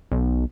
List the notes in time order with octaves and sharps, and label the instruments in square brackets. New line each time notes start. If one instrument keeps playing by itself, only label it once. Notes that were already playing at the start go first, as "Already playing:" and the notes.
[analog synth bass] B1